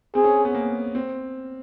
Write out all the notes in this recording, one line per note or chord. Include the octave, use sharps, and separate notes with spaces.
C4 G#4
C#4
B3
A#3
C4